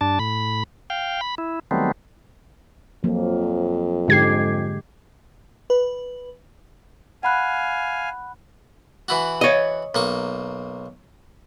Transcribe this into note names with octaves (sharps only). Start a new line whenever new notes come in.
G2 D4 A5
A2 B5
F5 G5
B5
E4
D#3 F#3 G3 A3 B3 C4
F2 F3 F#3 A#3
G#2 D3 G#3 G4 G#6 C7
B4
F5 F#5 G#5 B5 F#6
E3 E4 F#4
C#5 D#5
B1 A#3 C#6